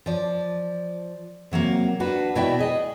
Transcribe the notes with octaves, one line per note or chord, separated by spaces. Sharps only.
F3 D5
C3 F#3 A3 A#3
D4 F#4 B4
B2 E4 F#4 D5 E5 G5
G#4 D#5